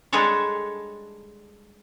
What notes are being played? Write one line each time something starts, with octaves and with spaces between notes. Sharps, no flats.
G3 G#3 D4 G#4 A4 C#5